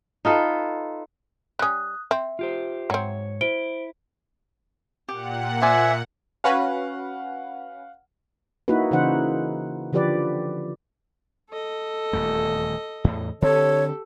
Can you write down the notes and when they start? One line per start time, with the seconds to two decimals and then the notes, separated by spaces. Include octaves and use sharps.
0.25 D#4 F4 A4 B4
1.59 G3 C#4 D#6 F#6
2.11 C4 E5
2.39 F4 G4 C5
2.90 G#2 F#3 C4 C#5
3.41 E4 C5 D7 G7
5.09 A#2 G4 F#5
5.61 C5 D5 E5 G#5
6.44 C#4 F#4 B4 F5 F#5
8.68 A#3 D#4 E4 F#4 B4
8.91 C#3 E3 D#4 C5 F#5
9.93 D3 F3 G4 B4 D5
11.50 A4 D#5
12.13 D#1 E2 A3
13.04 E2 A2
13.42 D3 C4 G4 A4 C#5